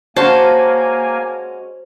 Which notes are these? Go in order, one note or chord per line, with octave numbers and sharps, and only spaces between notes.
G#3 A#3 C#4 F#4 C5 G#5 A5